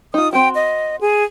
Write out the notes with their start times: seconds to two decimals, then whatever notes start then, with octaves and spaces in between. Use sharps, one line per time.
0.14 D#4 F4 D#6
0.33 C4 F#4 G5
0.55 D#5
1.01 G#4